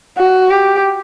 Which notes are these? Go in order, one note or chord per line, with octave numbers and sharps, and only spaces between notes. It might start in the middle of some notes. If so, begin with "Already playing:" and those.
F#4
G4